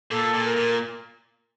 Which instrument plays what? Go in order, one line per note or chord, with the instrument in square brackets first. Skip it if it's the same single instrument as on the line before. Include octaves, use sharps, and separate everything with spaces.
[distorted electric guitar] A#2 [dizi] A4
[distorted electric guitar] A#2
[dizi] A#4
[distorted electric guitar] A#2